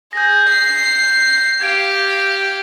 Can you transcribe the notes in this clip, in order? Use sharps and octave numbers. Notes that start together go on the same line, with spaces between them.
G#4 G6 A#6
C7
G4 F5 G#6 D7